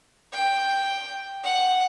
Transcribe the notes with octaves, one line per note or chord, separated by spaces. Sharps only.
G5
F#5